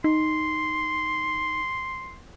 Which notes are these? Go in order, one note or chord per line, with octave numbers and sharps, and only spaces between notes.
D#4 C6